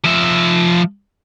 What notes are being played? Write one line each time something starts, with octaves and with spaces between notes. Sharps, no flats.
F3 E5